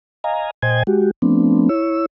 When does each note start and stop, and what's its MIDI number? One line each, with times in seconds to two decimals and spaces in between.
0.24 0.50 75
0.24 0.50 77
0.24 0.50 80
0.24 0.50 82
0.62 0.83 46
0.62 0.83 72
0.62 0.83 75
0.62 0.83 79
0.62 0.83 80
0.62 0.83 92
0.87 1.11 56
0.87 1.11 66
0.87 1.11 67
1.22 1.69 53
1.22 1.69 57
1.22 1.69 59
1.22 1.69 60
1.22 1.69 62
1.69 2.06 64
1.69 2.06 73
1.69 2.06 88